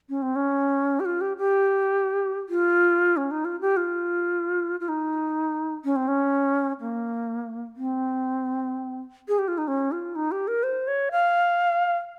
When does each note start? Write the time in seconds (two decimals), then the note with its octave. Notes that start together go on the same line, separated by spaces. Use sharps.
0.09 C#4
0.22 C4
0.36 C#4
1.00 G4
1.05 F4
1.21 G4
1.38 G4
2.49 F4
3.17 C#4
3.31 D#4
3.45 F4
3.61 G4
3.77 F4
4.80 F4
4.89 D#4
5.85 C#4
5.96 C4
6.08 C#4
6.80 A#3
7.76 C4
9.28 G#4
9.39 G4
9.48 F4
9.58 D#4
9.68 C#4
9.92 F4
10.15 D#4
10.32 G4
10.48 A#4
10.63 C5
10.87 C#5
11.12 F5